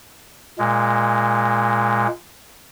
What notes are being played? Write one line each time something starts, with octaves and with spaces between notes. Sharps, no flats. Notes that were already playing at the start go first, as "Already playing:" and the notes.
A#2 G#3